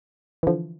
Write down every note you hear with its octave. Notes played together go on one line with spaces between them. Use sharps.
E3
D3 F3